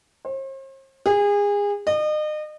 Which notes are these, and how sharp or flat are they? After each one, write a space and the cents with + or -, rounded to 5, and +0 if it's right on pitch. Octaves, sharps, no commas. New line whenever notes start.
C5 +45
G#4 -30
D#5 -35